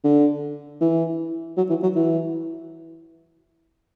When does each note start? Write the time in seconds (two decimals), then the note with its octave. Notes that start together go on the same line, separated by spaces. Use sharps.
0.04 D3
0.81 E3
1.57 F#3
1.69 E3
1.82 F#3
1.95 E3